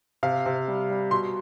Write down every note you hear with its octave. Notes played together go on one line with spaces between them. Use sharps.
C3 F5
C3
G3
G3
B2 C6